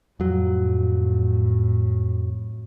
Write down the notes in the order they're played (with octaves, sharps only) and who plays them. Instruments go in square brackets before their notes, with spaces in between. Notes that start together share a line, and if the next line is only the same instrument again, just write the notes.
[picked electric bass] F2 F#3 [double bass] A2